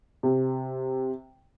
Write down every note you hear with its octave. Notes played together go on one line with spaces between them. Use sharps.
C3